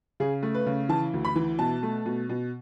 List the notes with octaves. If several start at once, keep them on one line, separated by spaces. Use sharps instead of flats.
C#3 G#4
A3
B4
C#3
E3 A5
D2
B5
E3
B2 A5
A3
B2
B2